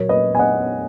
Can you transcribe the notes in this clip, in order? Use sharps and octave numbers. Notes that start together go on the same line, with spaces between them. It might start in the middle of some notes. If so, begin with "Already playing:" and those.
Already playing: A#2 F#3 A#3 A#4 C#5
B4 D#5
G#5
D#5 F#5